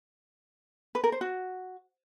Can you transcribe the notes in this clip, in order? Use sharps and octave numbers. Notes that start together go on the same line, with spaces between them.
B4
A#4
C5
F#4